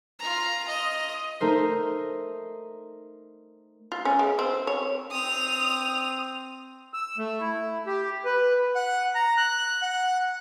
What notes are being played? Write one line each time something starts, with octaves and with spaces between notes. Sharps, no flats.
F4 A#5
D#5
A3 D#4 A#4 C5
F4
C#4
G#3
C4
C#5
C4 D#6 F7
E6
A3
E4
G4
B4
F#5
A#5
F#6
F#5